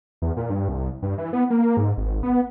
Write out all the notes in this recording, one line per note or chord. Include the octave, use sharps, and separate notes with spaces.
E2
A#2
G2
C2
G2
E3
B3
A#3
G#2
G#1
B3